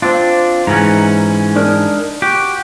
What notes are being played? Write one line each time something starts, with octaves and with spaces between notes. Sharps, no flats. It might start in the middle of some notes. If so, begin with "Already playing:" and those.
C4 D4 F4
G#2 E3 C#4 A#5
D4 D#4 A#4
F#4 G4